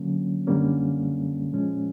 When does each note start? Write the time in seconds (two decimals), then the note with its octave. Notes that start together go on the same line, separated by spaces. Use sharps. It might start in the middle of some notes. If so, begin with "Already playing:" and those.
Already playing: D3 F#3 A#3 C#4
0.47 F#2 D3 G3 A#3 C#4
1.52 A#2 F3 G#3 C#4